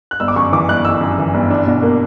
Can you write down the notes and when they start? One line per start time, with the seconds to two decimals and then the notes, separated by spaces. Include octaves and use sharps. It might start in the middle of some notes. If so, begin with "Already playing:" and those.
0.11 F#6
0.20 G1 E6
0.28 D6
0.36 F#2 C#6
0.52 E3 D6
0.68 G1 F#6
0.85 G1 E6
1.01 F#2
1.18 E3
1.34 G1
1.50 D4
1.66 B2
1.83 A#3